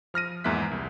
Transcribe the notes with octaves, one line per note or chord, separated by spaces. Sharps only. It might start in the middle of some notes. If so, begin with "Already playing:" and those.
F3 F6 A#6 D#7
E2 G#2 A#3 E5 F#6 B6
C2